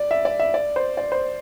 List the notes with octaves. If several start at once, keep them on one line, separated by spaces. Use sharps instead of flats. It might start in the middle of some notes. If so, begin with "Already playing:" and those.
Already playing: D5
E5
D5
E5
D5
C5
D5
C5